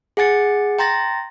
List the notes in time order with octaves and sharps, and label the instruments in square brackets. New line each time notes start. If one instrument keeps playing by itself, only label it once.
[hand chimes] G#4 F#5 G#5 A6 C#7
G5 A#5 C6 A6 A#6